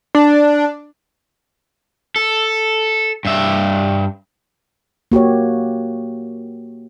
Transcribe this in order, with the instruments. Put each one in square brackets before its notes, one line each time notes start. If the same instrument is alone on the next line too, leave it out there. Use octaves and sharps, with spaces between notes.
[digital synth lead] D4
[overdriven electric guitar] A4
G2 E5
[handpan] A#3 F#4 G4 C#5